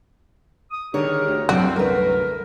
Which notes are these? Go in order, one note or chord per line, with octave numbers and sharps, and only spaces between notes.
D#6
D3 D#3 G4 G#4 A#4 C#5
D2
C2 F#2 D3 F#3 C4 F#4 D5
A3 A#4 B4